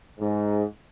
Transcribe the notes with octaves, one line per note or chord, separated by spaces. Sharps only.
G#2